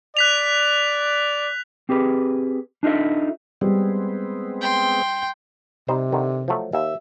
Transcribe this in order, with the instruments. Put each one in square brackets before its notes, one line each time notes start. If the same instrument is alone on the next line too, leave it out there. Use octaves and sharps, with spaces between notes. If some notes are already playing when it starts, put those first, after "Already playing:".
[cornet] D5 [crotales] F#6 B6 F7
[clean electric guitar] C4 G4 G#4 B4
D4 D#4 F4 A4 E5
[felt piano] G3 [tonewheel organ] G#3 B3 C4
[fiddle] G5 C6
[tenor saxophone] C3 [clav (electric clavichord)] G3 D#4 C5
[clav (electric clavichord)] D3 D#3
F3 F#3 A3
[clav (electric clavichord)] D#2 [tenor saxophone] E5